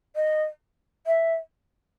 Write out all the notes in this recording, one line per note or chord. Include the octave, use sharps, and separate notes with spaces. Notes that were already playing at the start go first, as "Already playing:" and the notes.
D#5
E5